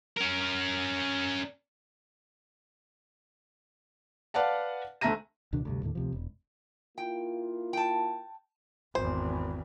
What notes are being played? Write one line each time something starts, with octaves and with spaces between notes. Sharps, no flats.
C#4 A#4
B4 D5 F5 F#5 A5
D2 A3 E5 A#5 A#6 D#7
C#2 B2 D#3 D4
D2 G2 C3
D#2 A2 D3
D2 C3 F3
E1
A#3 E4 F4 G5
G5 A5
G#1 E2 C5